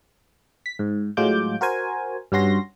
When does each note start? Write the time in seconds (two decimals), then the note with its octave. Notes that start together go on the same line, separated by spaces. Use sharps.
0.66 B6
0.79 G#2
1.17 A2 F#3 G#3 F4 D6 G6
1.61 F#4 A#4 C5 G#5
2.32 G2 G3 C#4 F#4 C6 A#6